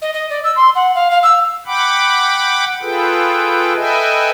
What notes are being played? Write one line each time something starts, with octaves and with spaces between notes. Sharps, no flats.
D#5
D#5
D5
E6
C6
F#5
F5
F5
E6
F#5 G5 B5 D6
F4 G#4 A4 B4 G5
A4 B4 D#5 E5 G5 G#5